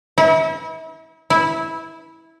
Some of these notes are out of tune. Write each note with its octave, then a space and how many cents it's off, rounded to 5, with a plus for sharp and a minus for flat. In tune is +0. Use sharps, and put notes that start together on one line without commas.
E4 -35
E4 -15